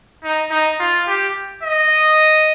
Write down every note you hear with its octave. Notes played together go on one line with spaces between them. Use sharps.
D#4
D#4
F4
G4
D#5